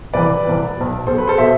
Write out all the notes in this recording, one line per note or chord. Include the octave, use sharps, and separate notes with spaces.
C2 C3 E3 B4 D5
C2 C3 E3
B1 B2
B1 B2 A4 C5
B4
A4 C5
B2 C5 E5